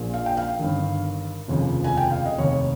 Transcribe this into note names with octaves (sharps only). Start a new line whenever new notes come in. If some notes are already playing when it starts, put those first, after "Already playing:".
Already playing: A#1 A#2 F3
F5
G5
F5
G1 G2 D#3
F1 D#2 C#3 F3
G#5
G5
F5
D#5
F1 D#2 D#3 C#5